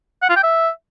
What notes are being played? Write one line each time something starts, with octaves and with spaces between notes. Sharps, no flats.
F#5
F4
G5
E5